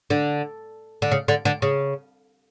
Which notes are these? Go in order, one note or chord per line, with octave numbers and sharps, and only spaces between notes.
D3
D3
C#3
D3
D3
C#3